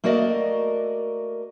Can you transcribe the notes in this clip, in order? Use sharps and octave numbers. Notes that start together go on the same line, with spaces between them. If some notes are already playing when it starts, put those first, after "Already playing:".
A3 A#3 F#4 A#4 D5 D#5